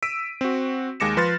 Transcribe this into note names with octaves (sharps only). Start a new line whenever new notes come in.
E6 B6 D7 D#7
C4 F#4
D#2 G#3 D6 A#6 C#7 E7
F3 B4 C6 F6 A6